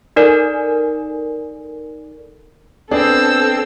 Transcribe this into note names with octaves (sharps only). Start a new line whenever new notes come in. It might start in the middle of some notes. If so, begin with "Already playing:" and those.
D#4 A4 A#4 D5 G#5
B3 C4 D4 G#4 A4 E6